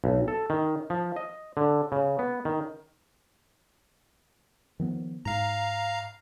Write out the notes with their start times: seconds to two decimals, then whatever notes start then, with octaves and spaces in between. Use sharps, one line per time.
0.04 B1
0.28 A4
0.50 D#3
0.90 F3
1.16 D#5
1.57 D3
1.92 C#3
2.19 B3
2.45 D#3
4.80 D#3 F3 B3
5.25 G#2 F5 A#5